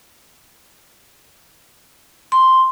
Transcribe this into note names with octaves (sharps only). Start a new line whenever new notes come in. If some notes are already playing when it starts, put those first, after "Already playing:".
C6